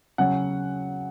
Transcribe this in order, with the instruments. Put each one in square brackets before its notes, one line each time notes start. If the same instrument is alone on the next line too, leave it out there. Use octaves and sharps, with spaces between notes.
[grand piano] C#3 F#3 C#4 F#5